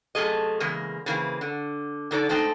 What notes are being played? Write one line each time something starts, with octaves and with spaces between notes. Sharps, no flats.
F#2 C3 A3 G#4 D#5
E2 C#3 G#3 A#3
C#3 E3 A#3 C4
D3
D3 D#4 A4 C#5 D5
G#3 A3 C4 D#4 F5 G5